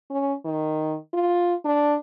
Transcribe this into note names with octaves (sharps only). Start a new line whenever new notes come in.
C#4
D#3
F4
D4